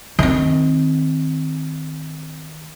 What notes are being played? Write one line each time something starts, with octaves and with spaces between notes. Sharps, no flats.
D#3 C4